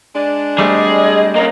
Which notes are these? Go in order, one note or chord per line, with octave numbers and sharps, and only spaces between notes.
G#3 D4
G3 A3 C4 G#4 D#5
A#3 C#4